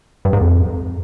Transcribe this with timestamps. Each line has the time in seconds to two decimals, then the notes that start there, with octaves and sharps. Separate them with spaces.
0.25 G2
0.33 G#2
0.41 F2